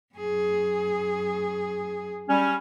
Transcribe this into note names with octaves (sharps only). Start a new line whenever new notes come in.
F#2 G#4
G3 C#4